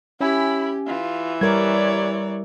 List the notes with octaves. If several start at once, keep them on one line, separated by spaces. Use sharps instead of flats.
C#4 E4 G4 G#5 B5
E3 F4
G3 A#4 C#5 D5 G#6